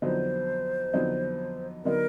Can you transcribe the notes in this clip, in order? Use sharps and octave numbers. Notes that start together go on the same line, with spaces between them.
F2 D3 F#3 B3 D#4 C5
F2 D3 F#3 B3 D#4
D3 F#3 B3 D#4 A#4